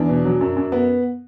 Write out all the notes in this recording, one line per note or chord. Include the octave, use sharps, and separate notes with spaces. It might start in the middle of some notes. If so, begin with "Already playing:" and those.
Already playing: E2 D4
B2
F#3
F#2
F#2
B3